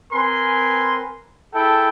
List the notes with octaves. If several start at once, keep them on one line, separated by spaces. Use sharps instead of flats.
C4 A#4 B4 G#5 C6
E4 G#4 A4 G5 A5